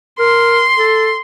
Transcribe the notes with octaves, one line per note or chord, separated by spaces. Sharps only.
A#4 C6
A4